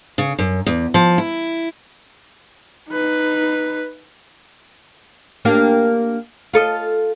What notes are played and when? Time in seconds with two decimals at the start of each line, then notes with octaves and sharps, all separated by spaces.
0.18 C#3
0.39 F#2
0.66 E2
0.94 F3
1.18 E4
2.90 D#4 B4
5.45 A#3 D4 G4
6.54 F4 A4 D#5